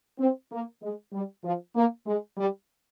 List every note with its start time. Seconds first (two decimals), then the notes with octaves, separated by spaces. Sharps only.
0.19 C4
0.51 A#3
0.82 G#3
1.13 G3
1.43 F3
1.75 A#3
2.06 G#3
2.37 G3